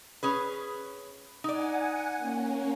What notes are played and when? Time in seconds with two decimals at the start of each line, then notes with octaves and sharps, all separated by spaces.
0.23 C#4 G#4 B4
1.44 D#4 D5 F#5 G#5
2.16 A#3 C#4